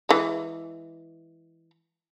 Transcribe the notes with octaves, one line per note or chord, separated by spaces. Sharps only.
E3 G#3